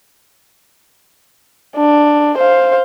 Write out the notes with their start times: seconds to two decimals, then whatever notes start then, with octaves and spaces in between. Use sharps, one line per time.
1.76 D4
2.38 C5 F5